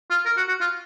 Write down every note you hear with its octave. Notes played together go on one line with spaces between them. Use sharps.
F4
A#4
F#4
F#4
F4